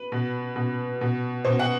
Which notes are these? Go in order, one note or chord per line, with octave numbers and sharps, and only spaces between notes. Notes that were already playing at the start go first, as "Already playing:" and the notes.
Already playing: B4
B2
B2
B2
B2 C5
F#5